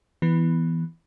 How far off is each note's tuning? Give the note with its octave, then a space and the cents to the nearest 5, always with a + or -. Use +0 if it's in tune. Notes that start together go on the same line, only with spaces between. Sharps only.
E3 +0 B3 +0